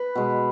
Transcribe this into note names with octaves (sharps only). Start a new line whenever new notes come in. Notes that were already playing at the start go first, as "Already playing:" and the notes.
Already playing: B4
B2 G#3